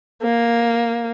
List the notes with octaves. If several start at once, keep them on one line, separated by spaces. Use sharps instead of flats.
A#3